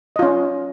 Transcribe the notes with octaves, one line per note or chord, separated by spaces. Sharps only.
C#4 F4 D#5